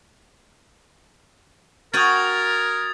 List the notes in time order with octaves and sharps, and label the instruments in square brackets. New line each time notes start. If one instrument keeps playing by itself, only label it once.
[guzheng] F#4 G5 G#5 [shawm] A#4 [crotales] D#6 G#6 A6